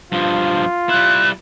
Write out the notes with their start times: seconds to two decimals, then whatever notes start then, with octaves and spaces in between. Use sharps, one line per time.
0.12 G2 F3 F4
0.89 G3 E4 F#6